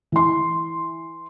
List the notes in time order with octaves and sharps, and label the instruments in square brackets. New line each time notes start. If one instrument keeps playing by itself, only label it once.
[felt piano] E3 C6